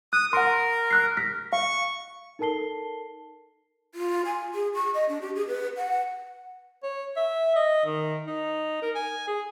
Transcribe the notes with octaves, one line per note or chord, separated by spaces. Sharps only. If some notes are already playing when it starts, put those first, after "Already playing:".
D#6 F#6
A#4 F#5 C6
F6 F#6 C7
F6 A#6 B6
F5 C#6
D#4 A4 A#4 A5 C7 G7
F4
G#5
G#4
C#6
D#5
D4
G4
G#4
B4
F#5
C#5
E5
D#5
D#3
D#4
A#4
G#5
G#4